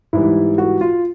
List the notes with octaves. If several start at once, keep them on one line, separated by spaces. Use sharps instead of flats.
G#2 E3 G3 E4
F#4
F4